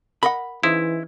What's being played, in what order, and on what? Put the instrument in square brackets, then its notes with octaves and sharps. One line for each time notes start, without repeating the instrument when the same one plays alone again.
[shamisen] A#4 D#5 F#5 [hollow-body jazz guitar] B5
[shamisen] C#3 D#4 C5 [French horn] E3 [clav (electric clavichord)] E4